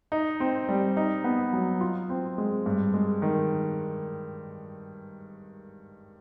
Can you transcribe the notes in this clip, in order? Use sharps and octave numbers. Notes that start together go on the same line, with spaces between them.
D#4
C4
G3
D#4
B3
F#3
F4
C4
G#3
G2
G#3
D#3